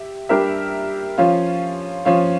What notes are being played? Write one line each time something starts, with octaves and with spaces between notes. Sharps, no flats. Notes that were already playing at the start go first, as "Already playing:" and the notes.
Already playing: G4 E5
G3 D4 G4 A#4 E5
F3 C#4 F4
F3 C#4 F4